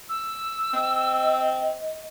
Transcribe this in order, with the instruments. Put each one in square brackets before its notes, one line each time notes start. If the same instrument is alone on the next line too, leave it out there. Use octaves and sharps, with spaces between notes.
[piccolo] E6
[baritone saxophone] C4 [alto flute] D#5